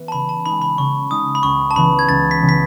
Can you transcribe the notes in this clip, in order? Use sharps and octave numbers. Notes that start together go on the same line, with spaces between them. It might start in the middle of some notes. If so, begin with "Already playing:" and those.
Already playing: E3 B3
A5
C#3 B5
A5
G#3 D#4 B5
B5
C#3 C#6
G#3 D#4 D#6
B5
C#2 C#6
A5
C#3 E3 B3 B5
G#6
C#2 A6
B6
C#3 E3 B3
B6